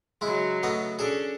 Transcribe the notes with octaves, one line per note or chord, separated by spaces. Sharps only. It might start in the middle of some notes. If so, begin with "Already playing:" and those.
C#3 F#3 G#3 E4
A3 B3 D#5
C#4 D4 G#4 A4